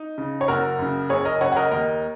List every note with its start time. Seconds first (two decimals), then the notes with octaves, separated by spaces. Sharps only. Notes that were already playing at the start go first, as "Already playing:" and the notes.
Already playing: D#4
0.18 C#3
0.41 C#5
0.48 F#1 F#4 A#4
0.79 F#2 C#3
1.09 F#1 G#4 C#5
1.25 A#4 D#5
1.41 F#2 C#3 C#5 F#5
1.52 F#5
1.56 A#4 D#5
1.71 D#2 A#4 D#5